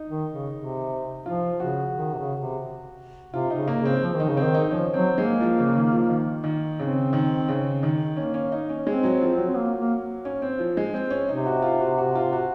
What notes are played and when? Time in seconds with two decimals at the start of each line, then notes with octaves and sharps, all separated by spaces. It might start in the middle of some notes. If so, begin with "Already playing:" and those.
Already playing: D#4
0.10 D#3
0.33 C#3
0.56 C3
1.26 F3 F4
1.60 C#3 F#4
1.95 D#3
2.14 C3
2.18 C#3
2.40 C3
3.33 C3 F4
3.50 D#4
3.56 C#3
3.68 A#3
3.79 C#3
3.85 C4
4.03 F3
4.15 D#3 D#4
4.29 C#3
4.37 C4
4.44 D#3
4.54 D#4
4.71 F3 C#4
4.94 F#3 C4
5.18 G#3 A#3
5.40 F3
5.58 C#3
5.75 D#3
5.92 F3
6.09 D#3
6.44 D#3
6.79 C#3 C4
7.13 D#3
7.48 C#3
7.83 D#3
8.17 A#3 C#4
8.34 C#4
8.52 D#4
8.69 C#4
8.86 G#3 C4
9.03 F#3
9.21 F3
9.38 F#3
9.49 C4
9.56 A#3
9.78 A#3
10.25 C#4
10.42 C4
10.59 F3
10.77 G#3
10.94 C4
11.10 C#4
11.29 C3 D#4
11.46 F#4
11.62 F4
11.80 F#4
11.98 F#4
12.15 F4
12.32 F#4